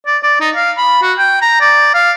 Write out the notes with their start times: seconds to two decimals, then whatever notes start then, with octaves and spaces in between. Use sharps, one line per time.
0.06 D5
0.23 D5
0.41 D#4
0.55 F5
0.78 B5
1.02 F#4
1.18 G5
1.42 A#5
1.61 D5
1.94 F5